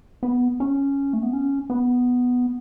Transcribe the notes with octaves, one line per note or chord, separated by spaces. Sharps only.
B3
C#4
A3
B3
C#4
B3